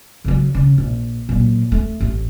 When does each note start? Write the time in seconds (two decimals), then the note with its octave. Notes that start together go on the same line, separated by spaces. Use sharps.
0.24 C#3 F#3
0.54 C#3
0.78 A#1
1.29 A#2 F#3
1.72 A3
2.00 A1